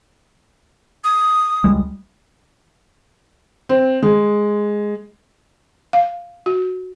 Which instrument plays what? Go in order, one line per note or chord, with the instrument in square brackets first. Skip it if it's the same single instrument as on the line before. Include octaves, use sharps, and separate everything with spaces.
[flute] D#6
[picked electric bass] C#2 G3 G#3
[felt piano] C4
G#3
[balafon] F5
F#4